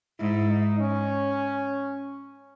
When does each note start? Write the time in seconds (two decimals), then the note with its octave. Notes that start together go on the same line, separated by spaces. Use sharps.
0.19 G#2 E4
0.50 D#4
0.80 C#4